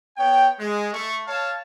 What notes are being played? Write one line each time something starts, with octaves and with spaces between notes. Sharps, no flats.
B3 C#5 G5
G#3
A3 A4 C#6
C#5 F5 A5